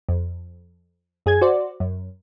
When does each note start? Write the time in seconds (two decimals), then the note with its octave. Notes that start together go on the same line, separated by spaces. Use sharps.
0.09 F2
1.26 F#2 G#4 G#5 G#6
1.41 F#4 C5 D5
1.80 F#2